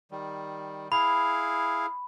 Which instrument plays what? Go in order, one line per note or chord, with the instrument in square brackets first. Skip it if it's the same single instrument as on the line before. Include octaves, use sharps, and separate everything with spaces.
[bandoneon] D#3 G3
[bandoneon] E4 G#4 F5 [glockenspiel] B5